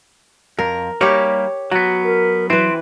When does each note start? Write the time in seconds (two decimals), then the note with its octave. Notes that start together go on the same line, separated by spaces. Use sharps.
0.59 F2 A#4
1.01 G3 A#3 D#4 G4 C#5
1.71 F#3 B3 F#4
2.04 A#4
2.50 E3 F#3 C4 B4